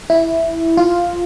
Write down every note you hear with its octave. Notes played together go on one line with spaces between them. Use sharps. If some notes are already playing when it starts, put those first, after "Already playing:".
E4
F4